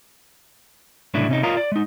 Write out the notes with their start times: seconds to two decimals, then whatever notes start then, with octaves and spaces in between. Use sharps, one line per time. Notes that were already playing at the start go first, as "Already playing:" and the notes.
1.14 C2 A2 C#3 F#3 D4 E4
1.29 C3 C#4 D#4
1.43 F4 A#4 C#5 D#5 F5 A#5
1.57 D5
1.72 G#3 D#4